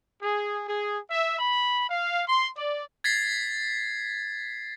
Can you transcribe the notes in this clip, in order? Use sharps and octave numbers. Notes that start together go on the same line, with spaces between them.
G#4
G#4
E5
B5
F5
C6
D5
G#6 A6 B6 C7